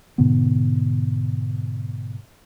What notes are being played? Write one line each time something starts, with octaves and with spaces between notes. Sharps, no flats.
G#2 B2 D3 B3